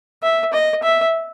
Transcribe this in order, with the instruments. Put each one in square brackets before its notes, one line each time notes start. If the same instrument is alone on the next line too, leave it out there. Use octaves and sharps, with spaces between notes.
[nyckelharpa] E5
D#5
E5